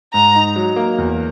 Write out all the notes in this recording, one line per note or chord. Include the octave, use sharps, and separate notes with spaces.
G#2 A#5
D#4
F#3
A#3
E2